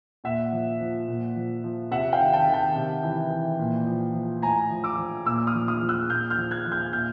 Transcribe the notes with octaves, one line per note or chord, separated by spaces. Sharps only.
A#2 E5 F#5
F3
F3
A#2
F3
F3
C3 E5 F#5
F5 G5
D#3
G5 A5
D#3
G5 A5
C3
E3
E3
A#2
F3
F3
A2 G#5 A#5
F3
D6 E6
F3
A#2 D6 E6
D#6 F6
F3
D#6 F6
F3
E6 F#6
A#2 F6 G6
F6 G6
F3
F#6 G#6
F3
F6 G6
A#2 F6 G6